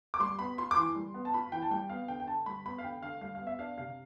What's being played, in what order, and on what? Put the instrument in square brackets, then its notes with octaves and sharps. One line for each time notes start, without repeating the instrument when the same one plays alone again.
[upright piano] D6
G3 C6
B3 B5
F4 C6
D6
E3 C6
G3
B3
A5
F4 B5
E3 G5
A5
G3 G5
B3 F5
D3 G5
G5
D3 A5
G3 B5
B3 B5
F5
D3 G5
D3 F5
G3 F5
F5
B3
E5
D4 F5
C3 F5